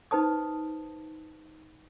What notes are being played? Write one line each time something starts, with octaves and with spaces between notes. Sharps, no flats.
D#4 B4 C5 A5 D#6